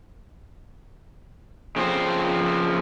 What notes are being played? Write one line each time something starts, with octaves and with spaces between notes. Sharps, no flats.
C#3 F3 C4 C5